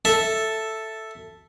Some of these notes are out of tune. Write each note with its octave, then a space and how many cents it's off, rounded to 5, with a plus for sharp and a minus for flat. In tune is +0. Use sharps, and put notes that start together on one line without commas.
A4 +0 E5 +0